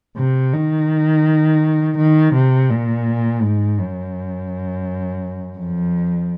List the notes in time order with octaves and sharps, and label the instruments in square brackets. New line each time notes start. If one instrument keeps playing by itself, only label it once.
[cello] C3
D#3
D#3
C3
A#2
G#2
F#2
F2